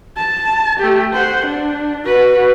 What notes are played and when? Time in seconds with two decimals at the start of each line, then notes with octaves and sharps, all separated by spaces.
0.17 A5
0.79 A3 G4
1.13 C5 F#5
1.45 D4
2.06 F#4 B4